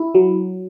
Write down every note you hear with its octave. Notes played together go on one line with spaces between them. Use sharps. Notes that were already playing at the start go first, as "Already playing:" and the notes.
Already playing: E4
F#3